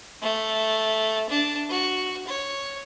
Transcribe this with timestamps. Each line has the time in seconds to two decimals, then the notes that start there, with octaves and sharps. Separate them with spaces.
0.21 A3
1.30 D4 A5
1.69 F#4
2.27 C#5